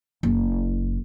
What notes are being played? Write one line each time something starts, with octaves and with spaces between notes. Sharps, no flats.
F#1